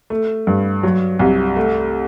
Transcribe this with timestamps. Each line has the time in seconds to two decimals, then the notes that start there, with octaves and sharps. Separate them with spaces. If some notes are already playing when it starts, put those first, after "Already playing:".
0.10 A3
0.47 G2
0.83 F#3
1.19 C2
1.56 A3